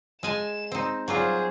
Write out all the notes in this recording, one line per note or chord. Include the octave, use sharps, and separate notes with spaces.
G#3 G#5 A5 E7
C4 D#4
F#3 G3 F4 G#4 C5